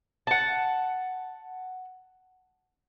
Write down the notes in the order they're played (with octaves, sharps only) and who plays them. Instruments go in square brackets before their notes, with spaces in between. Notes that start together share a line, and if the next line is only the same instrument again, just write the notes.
[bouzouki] F#5 A5